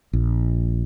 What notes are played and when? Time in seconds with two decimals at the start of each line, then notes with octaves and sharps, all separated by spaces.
0.13 A#1